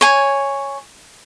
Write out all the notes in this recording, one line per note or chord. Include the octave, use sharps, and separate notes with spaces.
C#5 G#5